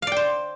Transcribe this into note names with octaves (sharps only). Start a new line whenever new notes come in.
C5 D5 F5 G5